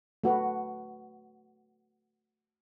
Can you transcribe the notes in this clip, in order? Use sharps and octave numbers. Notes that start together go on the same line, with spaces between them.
A3 F#4 B4